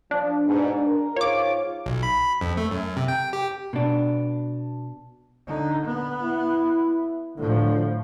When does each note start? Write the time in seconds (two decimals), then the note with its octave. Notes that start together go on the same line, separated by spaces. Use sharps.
0.11 F3 D4
0.46 G#2 B2
0.86 A#4
1.16 G#2 F4 C#5 D6
1.86 B1
2.03 B5
2.41 F2
2.57 A3
2.71 F#2
2.97 C3
3.08 G5
3.33 G4
3.73 B2 D4
5.47 D3 D#4
5.85 B3
6.22 E4
7.37 A2 D3 F3